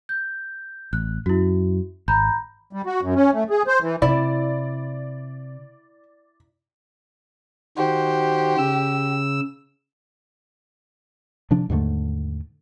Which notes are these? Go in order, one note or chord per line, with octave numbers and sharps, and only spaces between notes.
G6
A1 F#6
F#2 E4 F#4
G#1 A#5 B5 G6
G3
F#4
F#2
C#4
A3
G#4
C5
E3
C3 E4 D5
D#3 F#4 G4 C5
C#3 E6
C3 F3 D4
D#2 G#2 D3 A3